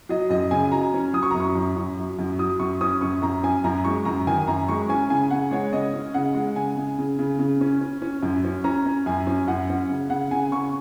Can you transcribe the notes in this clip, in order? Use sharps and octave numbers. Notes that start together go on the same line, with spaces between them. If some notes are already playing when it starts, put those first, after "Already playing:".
F#3 D#5
F#2 D#5
C#3 G#5
F#3 A#5
C#4
F#3 D#6
C#6
A#5
F#2
C#6
F#2
F#2
F#3
F#2
F#3 D#6
F#2 C#6
C#4 D#6
F#2 C#6
F#2 A#5
C#4 G#5
F#2 A#5
G#3 C#6
F#2 A#5
D#3 G#5
F#2 A#5
G#3 C#6
C#4 G#5
C#3 G#5
C#3 F#5
G#3 C#5
C#3 D#5
C#4
C#3 F#5
G#3
C#3 G#5
C#3
C#3
C#3
C#3
C#4
C#4
C#4
F#2
C#4
C#4 A#5
C#4
F#2 G#5
C#4
F#2 F#5
C#4
C#3
C#3 F#5
C#3 G#5
C#3 C#6